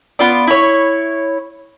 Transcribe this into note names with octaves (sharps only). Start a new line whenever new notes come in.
B3 F4 D5
E4 C#5